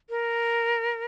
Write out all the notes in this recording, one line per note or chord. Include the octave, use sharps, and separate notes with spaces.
A#4